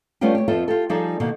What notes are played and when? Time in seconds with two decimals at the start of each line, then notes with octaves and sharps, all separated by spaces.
0.21 G3 A3 B3 C#4 F4 G4
0.35 G4 C#5
0.48 F2 B3 F4 A4 C5 E5
0.68 F4 G4 A4
0.89 F3 G3 D#4 G#4 A4 D5
1.20 B2 D#3 A#3